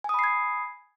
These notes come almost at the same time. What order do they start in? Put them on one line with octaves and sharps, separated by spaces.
G#5 D#6 B5 C7 G#6